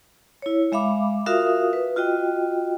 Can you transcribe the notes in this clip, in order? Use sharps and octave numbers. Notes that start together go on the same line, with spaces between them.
E4 C#5
G#3 E5 F5 B5 D6
F4 F#4 A#4 E5 F5 D#6
B4
F4 F#4 D#5 G5